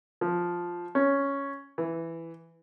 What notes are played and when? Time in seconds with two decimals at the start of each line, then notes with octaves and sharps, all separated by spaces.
0.21 F3
0.95 C#4
1.78 E3